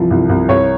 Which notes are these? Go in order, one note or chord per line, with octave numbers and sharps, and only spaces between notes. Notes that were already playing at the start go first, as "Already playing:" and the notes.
Already playing: C2 E3 F3
C2
C2
C2 C#5